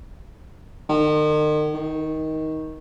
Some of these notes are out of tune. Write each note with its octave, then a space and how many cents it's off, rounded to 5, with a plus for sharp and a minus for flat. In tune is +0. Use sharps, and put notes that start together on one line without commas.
D#3 -40
D#3 +15